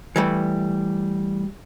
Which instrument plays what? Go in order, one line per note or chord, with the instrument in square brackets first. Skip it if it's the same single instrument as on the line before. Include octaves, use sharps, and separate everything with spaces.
[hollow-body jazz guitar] E3 G3 A3